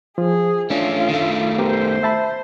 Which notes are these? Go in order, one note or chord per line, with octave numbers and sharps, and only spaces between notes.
F3 G#4
A3 C#4 D4 F4
D#3 A3
B3 G4 A#4 C5
E5 A5 B5